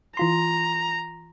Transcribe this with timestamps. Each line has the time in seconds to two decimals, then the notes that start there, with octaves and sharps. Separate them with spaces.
0.17 E3 F4 A#5 C6